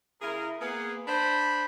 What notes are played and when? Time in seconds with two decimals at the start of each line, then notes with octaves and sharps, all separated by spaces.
0.21 C#3 E4 G#4 A#4
0.60 A#3 B3 G#4
1.07 D4 C5 B5